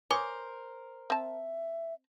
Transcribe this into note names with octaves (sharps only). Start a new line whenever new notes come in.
A#4 C5 C#5 G#5 D6 D#6
C4 E5 A5